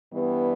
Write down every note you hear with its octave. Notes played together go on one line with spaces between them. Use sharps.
G2 E3 G3 B3